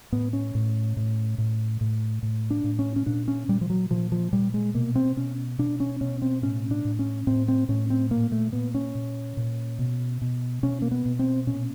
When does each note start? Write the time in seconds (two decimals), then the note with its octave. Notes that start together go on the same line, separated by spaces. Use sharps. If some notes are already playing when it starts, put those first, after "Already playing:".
0.12 A2 B3
0.33 C#4
0.55 A2
0.97 A2
1.38 A2
1.81 A2
2.23 A2
2.50 D4
2.64 A2
2.79 C#4
2.96 C#4
3.06 A#2 D4
3.28 C#4
3.48 A#2 G3
3.61 F3
3.70 F#3
3.91 A#2 F3
4.12 F3
4.33 A#2 G3
4.54 G#3
4.74 B2 A#3
4.95 C4
5.17 B2 C#4
5.58 B2 D4
5.80 C#4
6.01 B2 C#4
6.22 C4
6.42 A2 C#4
6.71 D4
6.85 A2
6.99 C#4
7.27 A2 C4
7.48 C4
7.69 A2 C#4
7.90 C4
8.11 A#2 A#3
8.32 A3
8.53 A#2 B3
8.75 C#4
8.95 A#2
9.37 A#2
9.79 B2
10.22 B2
10.63 B2 C#4
10.82 A#3
10.91 B3
11.06 B2
11.19 C4
11.47 A#2 C#4